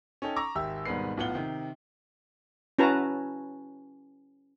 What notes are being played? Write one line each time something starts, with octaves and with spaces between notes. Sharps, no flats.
C#4 D#4 A4 G5
A#5 C#6 D6 E6 A#6
G#1 G4 E5 E6
G#1 G#2 B2 G3 B4 C7
B1 A2 B3 F4 F#5 G7
C3 D#3
C#4 E4 F#4 B4 A5 A#5